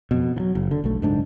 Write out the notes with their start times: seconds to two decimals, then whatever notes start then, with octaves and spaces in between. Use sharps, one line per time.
0.11 F2 B2
0.36 E3 F#3
0.55 F#1
0.71 D3
0.84 B1 A3
1.02 F#1 G#2 D4